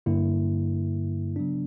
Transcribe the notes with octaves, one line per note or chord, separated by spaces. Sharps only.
G2 D3 A#3 E4
C#3 F#3 B3 D4